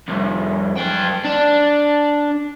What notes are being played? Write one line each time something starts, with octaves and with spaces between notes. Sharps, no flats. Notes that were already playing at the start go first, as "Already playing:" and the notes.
C2 F2
F#2 G5
D4